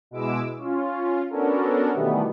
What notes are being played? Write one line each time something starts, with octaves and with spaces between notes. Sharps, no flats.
B2 G#3 E4 D6 E6
C#4 F4
B3 C#4 D4 F#4 A4 A#4
B2 D#3 E3 G3 A3 B3